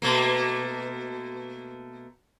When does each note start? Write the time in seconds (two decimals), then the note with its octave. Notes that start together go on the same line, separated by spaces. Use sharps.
0.02 B2 A3 A#3